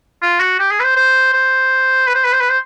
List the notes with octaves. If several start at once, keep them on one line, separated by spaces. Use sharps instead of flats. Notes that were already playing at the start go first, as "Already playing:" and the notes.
F4
F#4
G4
G#4
B4
C5
C5
C5
B4
C5
B4
C5
B4
C5